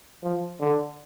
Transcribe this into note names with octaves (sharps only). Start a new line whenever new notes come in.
F3
D3